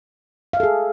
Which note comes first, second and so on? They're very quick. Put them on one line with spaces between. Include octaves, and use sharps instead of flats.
F5 E5 A4 G#4